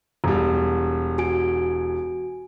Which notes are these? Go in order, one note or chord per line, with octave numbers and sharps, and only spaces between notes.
E1 G3
F#4 G#5 D7